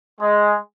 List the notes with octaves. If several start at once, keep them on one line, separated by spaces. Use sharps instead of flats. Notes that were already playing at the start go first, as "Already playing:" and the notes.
G#3